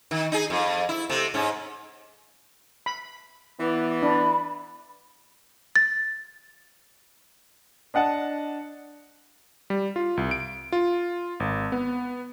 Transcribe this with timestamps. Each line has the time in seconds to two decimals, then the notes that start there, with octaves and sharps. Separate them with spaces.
0.11 D#3
0.32 D#4 G#4
0.50 F2
0.89 E4
1.10 C3 A3
1.34 G#2 C#4
2.86 B5
3.59 E3 B3 D5
4.02 D4 B5
5.76 A6
7.94 D4 D#5 F#5 A5
9.70 G3
9.96 F4
10.17 C2
10.31 D7
10.72 F4
11.40 G#1
11.72 B3